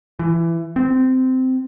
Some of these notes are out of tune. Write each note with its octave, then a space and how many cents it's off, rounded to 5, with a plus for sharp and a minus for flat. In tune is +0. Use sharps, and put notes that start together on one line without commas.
E3 +20
C4 -15